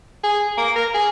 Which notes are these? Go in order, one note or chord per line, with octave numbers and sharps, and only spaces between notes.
G#4
A#3
A#4
G#4